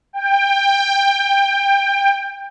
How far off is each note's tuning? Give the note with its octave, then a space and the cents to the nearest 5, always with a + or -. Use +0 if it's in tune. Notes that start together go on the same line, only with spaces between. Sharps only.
G5 +20